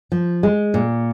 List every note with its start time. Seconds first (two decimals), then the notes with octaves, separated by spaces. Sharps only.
0.12 F3
0.43 G#3
0.74 A#2